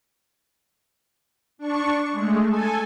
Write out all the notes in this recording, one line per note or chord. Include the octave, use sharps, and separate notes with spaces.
D4 C#6
G#3 A3
A4 G#5